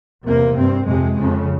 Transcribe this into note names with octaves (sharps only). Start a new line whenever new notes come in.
E2 C3 A#3
G2 C4
F2 C3 G#3
F2 C#3